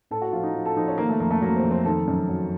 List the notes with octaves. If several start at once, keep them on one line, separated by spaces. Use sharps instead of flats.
A2 A4
F#4
F3 F4
D#4
F3
A4
F3 D#4
C#4
D#3 A#3
A3
F2 A#3
A3
F#3 A#3
C4
F2
C4
D#3 A4
F#2
F#3